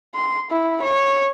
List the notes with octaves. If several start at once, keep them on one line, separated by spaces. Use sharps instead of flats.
C6
E4
C#5